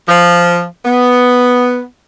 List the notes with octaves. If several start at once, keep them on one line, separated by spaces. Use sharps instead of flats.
F3
B3